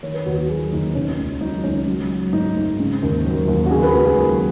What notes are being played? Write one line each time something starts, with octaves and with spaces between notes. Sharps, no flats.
D#3 C#5
B4
D#2 F#4
F#4
F#3 G#4
D#2 D#4
B2 C#4
C#2 D#4
F#3 D#4
C#2 C#4
F#3
F#3
G#2 D#4
G#2
C#3
D#2
F#3
D#2
F#4
C#3 G#4
B4
C#2 F#4
G#4
F#3